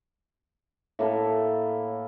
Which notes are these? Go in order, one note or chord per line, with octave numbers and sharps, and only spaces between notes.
A2 A#3 E4 A4